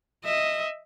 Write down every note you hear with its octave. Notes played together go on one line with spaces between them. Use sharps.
D#5 E5